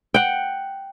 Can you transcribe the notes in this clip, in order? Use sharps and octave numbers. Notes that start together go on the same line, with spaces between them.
F#5 G5